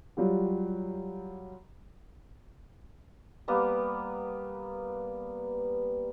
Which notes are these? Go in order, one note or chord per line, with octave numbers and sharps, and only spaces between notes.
F#3 G3 F4 G4
G3 A#3 B3